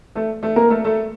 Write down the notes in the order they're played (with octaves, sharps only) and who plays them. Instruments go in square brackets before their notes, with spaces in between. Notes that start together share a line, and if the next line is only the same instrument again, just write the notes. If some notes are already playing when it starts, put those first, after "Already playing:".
[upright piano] A3 A4
A3 A4
A#3 A#4
A3 A4
A3 A4